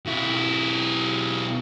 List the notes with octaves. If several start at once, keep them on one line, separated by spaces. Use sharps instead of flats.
B1 E4